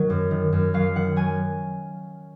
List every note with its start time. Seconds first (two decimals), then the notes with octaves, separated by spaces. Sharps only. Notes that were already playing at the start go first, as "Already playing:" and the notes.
Already playing: D#3 F#3 F#5
0.10 F#2
0.31 D#3
0.53 F#2
0.74 F#3 F5
0.95 D#3 F#5
1.16 F#3 G#5